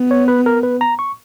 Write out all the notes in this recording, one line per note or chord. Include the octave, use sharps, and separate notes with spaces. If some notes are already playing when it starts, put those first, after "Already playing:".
Already playing: B3
C#5
B4
A#4
B4
A#5
C#6